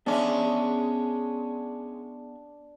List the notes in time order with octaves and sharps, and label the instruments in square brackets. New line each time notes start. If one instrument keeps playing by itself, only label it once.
[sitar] G#3 C#4 [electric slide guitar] B3 D5 E5 [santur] D4